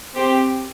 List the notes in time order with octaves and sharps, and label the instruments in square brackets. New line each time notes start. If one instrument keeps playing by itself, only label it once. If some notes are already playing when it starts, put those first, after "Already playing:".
[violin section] C4 G4 C5